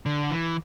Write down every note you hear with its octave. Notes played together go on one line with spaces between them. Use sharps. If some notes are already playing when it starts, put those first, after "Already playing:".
D3
E3